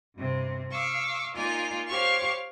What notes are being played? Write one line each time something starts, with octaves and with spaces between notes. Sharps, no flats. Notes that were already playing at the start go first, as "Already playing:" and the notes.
G2 C3
F5 C#6 D6 E6
A#3 D#4 F4 D5 G#5
G4 C5 C#5 F5 C#6 F6